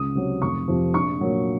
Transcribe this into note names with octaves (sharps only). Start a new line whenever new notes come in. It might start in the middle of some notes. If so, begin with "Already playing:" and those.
Already playing: C#2 D#6
C3 F#3
F1 C#6
F2 C3 F3
A#1 C#6
A#2 F#3